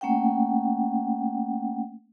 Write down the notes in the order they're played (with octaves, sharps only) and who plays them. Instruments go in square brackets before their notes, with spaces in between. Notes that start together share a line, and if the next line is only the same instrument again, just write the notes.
[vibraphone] A3 A#3 C#4 F#5 G5